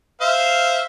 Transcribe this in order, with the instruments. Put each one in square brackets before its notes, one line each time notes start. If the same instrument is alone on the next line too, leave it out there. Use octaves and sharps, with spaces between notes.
[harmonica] C5 E5 F5